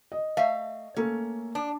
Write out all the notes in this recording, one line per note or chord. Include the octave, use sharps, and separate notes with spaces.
D#5
A3 E5 F5
A3 A#3 C#4 A4
D4